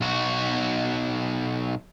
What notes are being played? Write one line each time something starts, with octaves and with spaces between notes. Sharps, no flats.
B1 F#4